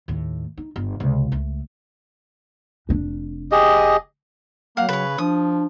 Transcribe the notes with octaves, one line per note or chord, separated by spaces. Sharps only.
D#2 A2
D#4
G1 F4
C#2 C3
C#2 A3
F1 D4
G4 G#4 D#5
F#3 A#3 F5 F#5
C#3 B4 C#5
F3 D4 D#6